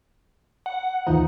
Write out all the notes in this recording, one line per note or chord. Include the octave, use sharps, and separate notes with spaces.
F#5
D#2 E3 F3 D#4